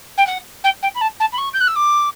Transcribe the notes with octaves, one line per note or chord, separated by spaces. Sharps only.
G5
F#5
G5
G5
B5
A5
A5
B5
C#6
G6
F#6
E6
D6